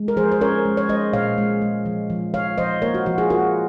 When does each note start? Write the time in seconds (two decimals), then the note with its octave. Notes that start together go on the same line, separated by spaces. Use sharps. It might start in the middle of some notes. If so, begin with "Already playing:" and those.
Already playing: G#3
0.08 A#4
0.17 F3 G#4 C5
0.32 C5
0.41 C#4 A#4 C#5
0.65 G#3
0.77 C#5
0.89 G#3 C5 D#5
1.13 A#2 C#5 F5
1.38 G#3
1.62 G#3
1.86 F3
2.10 F3
2.34 F3 C#5 F5
2.58 F3 C5 D#5
2.82 A#3 A#4 C#5
2.94 F#4
3.06 F3 F#4
3.18 F4 G#4
3.30 F4 F#4 A#4